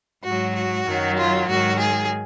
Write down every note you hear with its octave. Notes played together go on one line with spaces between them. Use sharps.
G#2 F#3 F#4
F#4
F#2 D#3 F#3
F4
G#2 D#3 F#3 F#4
G#4